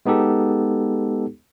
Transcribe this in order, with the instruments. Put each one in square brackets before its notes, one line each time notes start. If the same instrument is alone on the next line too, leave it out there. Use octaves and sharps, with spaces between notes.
[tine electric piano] G#3 B3 D#4 G4 A4